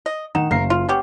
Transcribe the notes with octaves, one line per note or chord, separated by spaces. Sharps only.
D#5
D#3 D#4 F#5 E7
F#1 A#4 F5 C7
F4
B3 C#4 G4